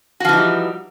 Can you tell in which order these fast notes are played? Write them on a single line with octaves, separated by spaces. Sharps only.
F#4 F3 E3 D#4 G3